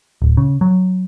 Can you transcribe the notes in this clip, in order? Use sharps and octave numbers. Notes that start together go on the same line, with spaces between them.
D1
C#3
F#3